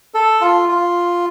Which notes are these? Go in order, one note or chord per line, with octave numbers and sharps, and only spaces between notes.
A4
F4
F4